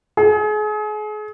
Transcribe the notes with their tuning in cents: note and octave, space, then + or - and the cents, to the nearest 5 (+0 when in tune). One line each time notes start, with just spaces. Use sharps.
G#4 +35